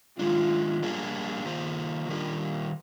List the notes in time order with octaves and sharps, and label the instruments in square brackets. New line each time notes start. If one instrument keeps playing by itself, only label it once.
[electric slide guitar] D#3 G#3 D4 [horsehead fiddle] F4
[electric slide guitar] G3 A#3 D4 G#4
D#3 A#3 F4 C5
[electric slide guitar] D#3 G3 A#3 F4 [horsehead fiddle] D4